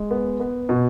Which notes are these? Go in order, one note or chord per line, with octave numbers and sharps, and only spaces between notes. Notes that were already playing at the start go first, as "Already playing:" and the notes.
Already playing: G#3
B3
B3
B2